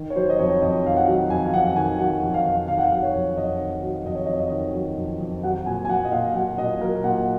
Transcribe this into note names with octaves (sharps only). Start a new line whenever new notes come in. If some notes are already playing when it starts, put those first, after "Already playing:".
Already playing: D#3
C#5
F#3 C5
D#5
F2 C#5
F2 D#5
D#3 F5
F#5
F#3
F2 G#5
F5
F2 F#5
D#3 G#5
F#3 F#5
F2
F5
F2
D#3 F5
F#5
F5
F#3
C#5
F2
F2 D#5
D#3
F#3
F2 D#5
C#5
F2 D#5
D#5
D#3
F#3
F2
F2
F#3 F#5
A#2 G#5
G#5
F#3 F#5
D#5
A#2 F5
F#3 F#5
A#2 D#5
F#3 A#4
A#2 F#5